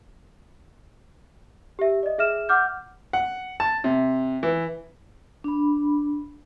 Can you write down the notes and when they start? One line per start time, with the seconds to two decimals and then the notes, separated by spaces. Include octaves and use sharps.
1.79 G4 E5
2.03 D5 D#5
2.18 G#4 E5 F6 E7
2.49 F#5 D6 F6 G6
3.13 F#5
3.60 A5
3.84 C3
4.43 E3
5.44 D4 B5